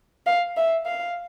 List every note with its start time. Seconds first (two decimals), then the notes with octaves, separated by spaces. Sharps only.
0.27 F5
0.57 E5
0.86 F5